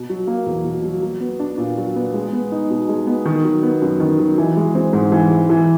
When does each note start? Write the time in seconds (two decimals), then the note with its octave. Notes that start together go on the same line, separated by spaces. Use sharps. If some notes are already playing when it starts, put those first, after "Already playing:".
Already playing: B2
0.09 F#3
0.27 A#3
0.46 E2
0.64 B2
0.84 F#3
1.02 F#3
1.20 B3
1.39 D4
1.58 A#2
1.77 F#3
1.96 B3
2.14 G#3
2.33 B3
2.52 D#4
2.70 B2
2.89 G#3
3.07 B3
3.26 D#3
3.44 F#3
3.63 B3
3.82 F#2
4.00 D#3
4.19 F#3
4.38 E3
4.57 G#3
4.75 C4
4.93 G#2
5.12 E3
5.31 G#3
5.50 E3